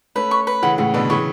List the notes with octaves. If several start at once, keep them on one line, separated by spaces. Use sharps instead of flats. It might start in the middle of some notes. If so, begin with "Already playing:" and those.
A3 C#4 B4
C#6
B4
C#3 E3 F#5
A2 C#3 F#5
B2 D3 B4
C#3 E3 C#6